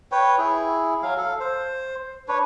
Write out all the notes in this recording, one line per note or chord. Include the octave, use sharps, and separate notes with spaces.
B4 C#5 G5
E4 G#4
F#3 F5
A4 F5
C5
D4 B4 C#5